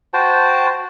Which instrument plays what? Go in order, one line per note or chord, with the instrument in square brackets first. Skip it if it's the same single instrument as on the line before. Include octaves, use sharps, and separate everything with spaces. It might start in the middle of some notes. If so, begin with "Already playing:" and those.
[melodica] F#4 C5 G5 A5